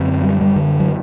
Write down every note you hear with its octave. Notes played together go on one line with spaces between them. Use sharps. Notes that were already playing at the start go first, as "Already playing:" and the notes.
Already playing: F#2 D3 C4
G3
G3
D3
F#3